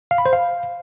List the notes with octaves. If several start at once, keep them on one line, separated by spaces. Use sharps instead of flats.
F5
B5
C5
F5